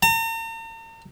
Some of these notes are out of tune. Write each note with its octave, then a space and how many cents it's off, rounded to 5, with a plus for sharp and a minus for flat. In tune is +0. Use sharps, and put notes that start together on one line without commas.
A#5 -45